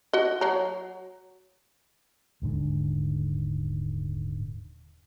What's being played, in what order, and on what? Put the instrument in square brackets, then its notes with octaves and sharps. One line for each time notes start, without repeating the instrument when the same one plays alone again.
[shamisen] F#4 D#5
F#3 A#5
[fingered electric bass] D#1 G#2 D3